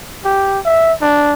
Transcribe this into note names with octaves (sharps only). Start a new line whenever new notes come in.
G4
E5
D4